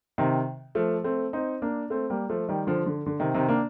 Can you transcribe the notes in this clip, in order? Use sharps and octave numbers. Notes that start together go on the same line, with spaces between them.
C3 D#3
F3 A3
A3 C4
C4 D#4
A#3 D4
A3 C4
G3 A#3
F3 A3
D#3 G3
D3 F3
D3
D3
C3 D#3
C3 D#3
A#3 D4